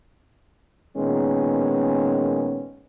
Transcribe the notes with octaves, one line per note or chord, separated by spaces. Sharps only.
A#2 D#3 G#3 B3 C#4